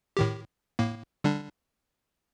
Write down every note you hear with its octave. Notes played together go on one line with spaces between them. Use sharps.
A2 D#3 G4
A2 A#3
D3 G3 D4